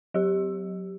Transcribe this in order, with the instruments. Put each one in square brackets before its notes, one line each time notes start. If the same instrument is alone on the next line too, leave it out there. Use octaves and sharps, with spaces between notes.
[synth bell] F#3 G4